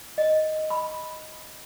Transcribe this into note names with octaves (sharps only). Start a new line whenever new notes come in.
D#5
B5